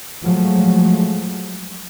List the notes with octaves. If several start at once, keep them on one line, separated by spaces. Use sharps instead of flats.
F3 F#3 G#3 A3